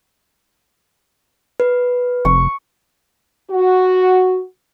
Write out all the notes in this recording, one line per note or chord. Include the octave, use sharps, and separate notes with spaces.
B4
F1 C#6
F#4